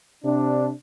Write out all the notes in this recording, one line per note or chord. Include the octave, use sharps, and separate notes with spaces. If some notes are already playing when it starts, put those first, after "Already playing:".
C3 D4